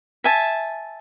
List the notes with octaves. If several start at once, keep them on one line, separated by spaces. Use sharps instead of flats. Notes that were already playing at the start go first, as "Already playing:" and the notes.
E5 G#5 A5